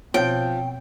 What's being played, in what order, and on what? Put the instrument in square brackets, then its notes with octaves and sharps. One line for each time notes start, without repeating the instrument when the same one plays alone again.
[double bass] B2 C4 [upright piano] F3 [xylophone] C#5 D7 [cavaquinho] G5